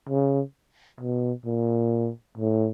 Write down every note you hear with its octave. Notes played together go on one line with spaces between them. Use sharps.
C#3
B2
A#2
A2